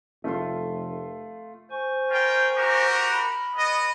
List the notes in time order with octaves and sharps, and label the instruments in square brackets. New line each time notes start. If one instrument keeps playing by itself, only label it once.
[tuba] F1 [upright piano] A3 F4 C6
[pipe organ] C5 G#5 C#6
[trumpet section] F4 A#4 G5
F#4 G4 A#4
[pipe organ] B5
[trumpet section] B3 D#5